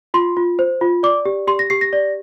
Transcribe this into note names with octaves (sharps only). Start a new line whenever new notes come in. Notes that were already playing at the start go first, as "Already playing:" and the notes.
F4 C6
F4
C5
F4
D5 D6
G4
G4 C6
A#6
G4 C7
A#6
D5